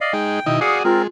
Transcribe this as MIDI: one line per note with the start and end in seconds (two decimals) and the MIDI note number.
0.01 0.13 74
0.01 0.13 75
0.01 0.13 77
0.13 0.40 56
0.13 0.40 63
0.13 0.57 79
0.46 0.59 47
0.46 0.60 51
0.46 0.60 64
0.46 0.60 75
0.61 0.83 66
0.61 0.83 68
0.61 0.83 74
0.61 0.78 77
0.61 0.78 78
0.61 0.82 87
0.84 1.07 56
0.84 1.02 60
0.84 1.05 65
0.84 1.02 70